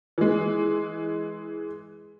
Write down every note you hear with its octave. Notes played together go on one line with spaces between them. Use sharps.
E3 G#3